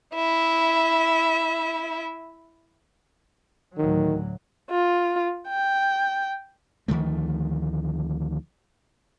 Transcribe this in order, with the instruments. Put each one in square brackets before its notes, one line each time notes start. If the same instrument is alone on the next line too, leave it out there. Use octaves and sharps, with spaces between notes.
[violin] E4 E5
[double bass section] D2 A2 F#3 [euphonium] D#3
[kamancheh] F4
G5
[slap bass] D2 D#3 F3 A3